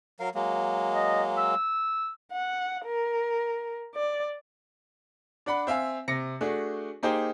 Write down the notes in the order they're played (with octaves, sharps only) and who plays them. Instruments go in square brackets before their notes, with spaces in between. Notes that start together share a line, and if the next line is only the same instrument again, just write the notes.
[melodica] F#3 A#4 F5
F#3 G#3 A#3
[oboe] D#5
E6
[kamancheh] F#5
A#4
D5
[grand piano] D4 D5 F#5 B5
C4 E5 F5 G#5
C3 A#6 C#7
A3 D4 F#4 G#4
A#3 D#4 G4 G#4 C5